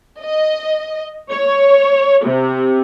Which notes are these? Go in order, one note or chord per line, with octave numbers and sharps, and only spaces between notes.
D#5
C#5
C3